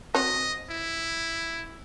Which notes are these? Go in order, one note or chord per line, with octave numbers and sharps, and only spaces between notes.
C4 F#4 C#5 D#5
E4